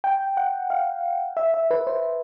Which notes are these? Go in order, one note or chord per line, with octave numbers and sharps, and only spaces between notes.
G5
F#5
F5
E5
E5
B4
C5